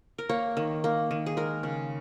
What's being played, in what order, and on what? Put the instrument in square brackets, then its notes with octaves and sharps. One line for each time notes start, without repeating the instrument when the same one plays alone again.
[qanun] A#4
A#3 C#5
D#3
A#3
D#3
G#4
G#3 A#4
C#3